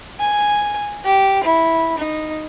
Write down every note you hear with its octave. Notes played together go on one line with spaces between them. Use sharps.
G#5
G4
E4
D#4